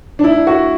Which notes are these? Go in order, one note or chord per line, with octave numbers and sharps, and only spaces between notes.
D4
E4
F#4